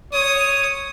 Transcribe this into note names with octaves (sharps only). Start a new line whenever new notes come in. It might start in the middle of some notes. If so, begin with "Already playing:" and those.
C#5 D#6